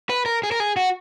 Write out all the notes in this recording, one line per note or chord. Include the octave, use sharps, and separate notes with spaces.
B4
A#4
G#4
A#4
G#4
F#4